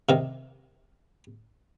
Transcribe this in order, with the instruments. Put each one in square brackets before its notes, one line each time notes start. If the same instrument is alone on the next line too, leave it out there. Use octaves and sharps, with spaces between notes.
[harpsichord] C3 D#3